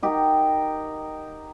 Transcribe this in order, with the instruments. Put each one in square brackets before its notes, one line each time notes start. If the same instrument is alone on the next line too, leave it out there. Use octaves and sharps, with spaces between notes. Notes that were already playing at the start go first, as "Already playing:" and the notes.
[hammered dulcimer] D#4 G4 A#4 F#5